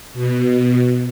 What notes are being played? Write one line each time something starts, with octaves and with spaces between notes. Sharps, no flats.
B2